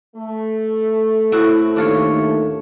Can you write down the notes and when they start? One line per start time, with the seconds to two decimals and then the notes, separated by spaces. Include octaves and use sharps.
0.16 A3
1.32 A2 C4 F#4
1.76 D#2 D4 F4 C#5